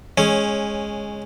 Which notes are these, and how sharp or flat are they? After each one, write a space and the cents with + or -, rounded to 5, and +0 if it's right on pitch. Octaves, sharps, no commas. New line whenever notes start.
G#3 +0 C#4 -15 C#5 +0